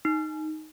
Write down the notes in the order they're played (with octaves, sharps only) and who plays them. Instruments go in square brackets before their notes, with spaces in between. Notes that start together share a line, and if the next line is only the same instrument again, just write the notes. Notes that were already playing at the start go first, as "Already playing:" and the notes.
[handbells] D#4